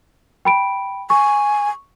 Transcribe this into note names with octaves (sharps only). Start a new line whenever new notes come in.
G5 B5 D7
G#5 C#6